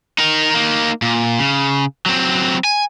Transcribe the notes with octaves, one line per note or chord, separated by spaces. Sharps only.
D#4 A#4
A#3 D#4
A#2
C#3
F#3 C4
G#5